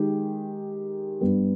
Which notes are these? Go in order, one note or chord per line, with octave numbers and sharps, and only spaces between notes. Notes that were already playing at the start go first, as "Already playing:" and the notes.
Already playing: D#3 G#3 D#4 G4
G2 G3 B3